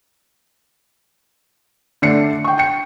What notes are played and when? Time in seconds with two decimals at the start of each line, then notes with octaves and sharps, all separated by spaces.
2.02 D3 A3 D5 C7 C#7
2.44 G5 C#6
2.58 G5 C#7